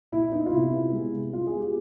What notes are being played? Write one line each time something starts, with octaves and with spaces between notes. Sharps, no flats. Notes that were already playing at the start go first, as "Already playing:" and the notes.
A#2 E4
B3 D#4
F4
C3 E4
B3
G#3
C3
G#3 F4
G#4
B3
G4